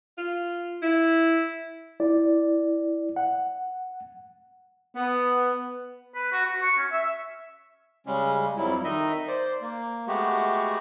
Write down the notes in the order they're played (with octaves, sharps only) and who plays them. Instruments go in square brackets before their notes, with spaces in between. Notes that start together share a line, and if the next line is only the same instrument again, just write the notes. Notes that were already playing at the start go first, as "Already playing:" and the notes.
[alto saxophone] F4
E4
[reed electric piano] E4 D5
F#5
[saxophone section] B3
[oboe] B4
F#4
F#4
C#6
C#4
E5
[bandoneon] C#3 G3 G#3 C#4
F2 F#3 G3 E4
D#3 D#4 D#5 E5
C5 D5
A#3
G#3 A3 B3 F#4 G4